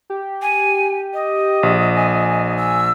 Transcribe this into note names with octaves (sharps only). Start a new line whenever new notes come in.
G4
G#5
D#5
A#1
G#5
E6